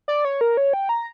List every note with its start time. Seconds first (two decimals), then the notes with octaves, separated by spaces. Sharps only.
0.08 D5
0.25 C#5
0.41 A#4
0.57 C#5
0.73 G5
0.89 A#5